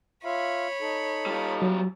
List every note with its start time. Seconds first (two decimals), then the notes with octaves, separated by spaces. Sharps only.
0.24 F4 C#5 E5 F5 B5
0.81 D#4 A4
1.26 G3 F4
1.62 F#3